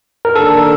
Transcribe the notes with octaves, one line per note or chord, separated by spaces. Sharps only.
A#4
D#3 A#3 D4 A4